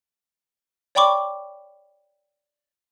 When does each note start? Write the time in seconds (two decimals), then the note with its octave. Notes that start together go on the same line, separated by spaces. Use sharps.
0.95 C#5 D5 G5 B5 C#6 D6